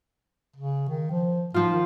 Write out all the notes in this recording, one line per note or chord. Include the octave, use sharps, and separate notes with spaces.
C#3
D#3
F3
G#2 F3 F4
D#3